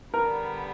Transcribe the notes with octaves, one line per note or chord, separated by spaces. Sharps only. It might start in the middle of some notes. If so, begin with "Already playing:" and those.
D3 G3 B3 D4 A#4